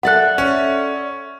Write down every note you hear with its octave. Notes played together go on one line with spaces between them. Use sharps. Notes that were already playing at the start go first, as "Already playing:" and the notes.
A4 D5 E5 F#5 F#6
C#4